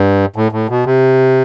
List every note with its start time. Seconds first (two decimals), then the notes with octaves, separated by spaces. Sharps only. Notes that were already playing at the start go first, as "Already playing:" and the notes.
Already playing: G2
0.36 A2
0.52 A2
0.69 B2
0.86 C3